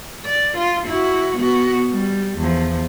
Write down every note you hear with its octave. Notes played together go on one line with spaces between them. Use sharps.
D5
F4
E4 F#4
B3 F#4
G3
E2 F3